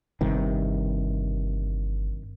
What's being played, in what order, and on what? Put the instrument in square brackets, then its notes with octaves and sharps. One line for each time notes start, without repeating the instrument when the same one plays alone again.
[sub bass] G1 [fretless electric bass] G2 C3 D#3